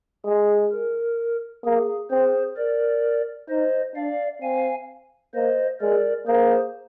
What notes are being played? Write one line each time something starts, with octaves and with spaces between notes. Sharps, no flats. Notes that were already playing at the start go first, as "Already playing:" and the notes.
G#3 G#4
A#4
A#3 G#4
C4 G#4 C5
A#4 D5
D#4 C5 D#5
D4 D5 F5
C4 F5 G#5
A#3 C5 D#5
G#3 A#4 D5
A#3 G#4 C5